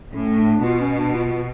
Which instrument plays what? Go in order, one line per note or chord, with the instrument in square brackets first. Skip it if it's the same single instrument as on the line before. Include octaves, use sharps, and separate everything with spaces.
[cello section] A2 [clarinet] C#4
[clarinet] D4
[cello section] B2 [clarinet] F4
[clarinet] C#4
D4
F4